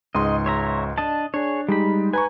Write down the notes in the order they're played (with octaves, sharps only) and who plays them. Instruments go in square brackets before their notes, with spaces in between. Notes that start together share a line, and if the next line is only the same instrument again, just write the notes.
[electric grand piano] C#2 G#2 C6 [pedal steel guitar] D#5
[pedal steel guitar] C#5 E5 A#5
D4 D#5 A5
[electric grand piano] D4 [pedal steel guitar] G#4 C#5
[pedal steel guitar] G3 B5 [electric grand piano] G#3 D#4 G4
[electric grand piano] B4 A#5 C#6 [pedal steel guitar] G#5